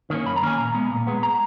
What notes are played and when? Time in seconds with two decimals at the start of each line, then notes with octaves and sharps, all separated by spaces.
0.10 D#3 A#3 C#4
0.26 F#2 B5
0.36 A#5
0.42 D#3 A#3 C#4 G#5
0.58 A#2 A#5
0.74 G#3 B3
0.91 A#2
1.07 G#3 B3
1.23 A#5